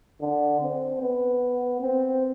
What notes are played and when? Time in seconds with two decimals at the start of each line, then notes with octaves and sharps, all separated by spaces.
0.21 D3
0.61 C4
1.01 B3
1.81 C4